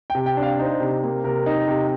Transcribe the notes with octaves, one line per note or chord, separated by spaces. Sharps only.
G5
C3
G5
D4
F5
D#4 C5
C3
A#3
C3 A#4
D#4
C3